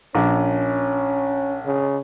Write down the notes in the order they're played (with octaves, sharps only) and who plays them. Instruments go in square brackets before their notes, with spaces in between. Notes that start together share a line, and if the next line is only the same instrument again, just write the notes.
[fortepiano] A#1 [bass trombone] C#4
[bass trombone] C#3